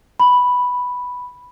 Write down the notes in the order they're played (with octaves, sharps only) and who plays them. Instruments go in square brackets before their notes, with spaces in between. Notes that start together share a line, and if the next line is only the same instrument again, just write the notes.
[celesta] B5